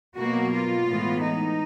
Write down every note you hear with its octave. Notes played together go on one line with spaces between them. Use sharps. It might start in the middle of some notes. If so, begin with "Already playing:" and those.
B2 F#3 A#3 F#4
F4
A2 E3 G#3 B3
D#4